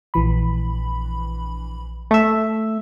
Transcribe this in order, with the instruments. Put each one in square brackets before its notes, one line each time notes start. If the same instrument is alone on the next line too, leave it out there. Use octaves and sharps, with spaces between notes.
[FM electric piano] A#1 E3 B5
[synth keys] A3 E5